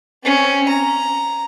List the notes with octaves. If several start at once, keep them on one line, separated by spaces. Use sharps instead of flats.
C4 C#4
A#5